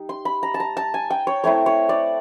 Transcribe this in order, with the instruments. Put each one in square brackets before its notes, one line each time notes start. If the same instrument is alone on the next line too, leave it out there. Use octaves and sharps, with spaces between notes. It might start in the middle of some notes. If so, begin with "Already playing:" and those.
Already playing: [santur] G3 D#4
C6
B5
A#5
A5
A#5
A5
G#5
G5
C#5
A3 C4 E4 C#5
C#5
D5